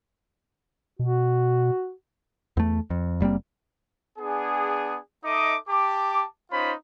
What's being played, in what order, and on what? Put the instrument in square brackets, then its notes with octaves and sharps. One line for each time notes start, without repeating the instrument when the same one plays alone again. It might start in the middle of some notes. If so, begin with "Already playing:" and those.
[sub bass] B2 [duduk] F#4
[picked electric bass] E2 A3
F2
F#1 G3 A#3 C4
[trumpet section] B3 D4 G#4
D#4 A4 D#5 E5 D6
G4 A5 D6
C#4 D#4 F4 C5 B5